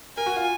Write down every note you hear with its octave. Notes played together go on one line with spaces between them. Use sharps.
A#4 G#5
F#4
F4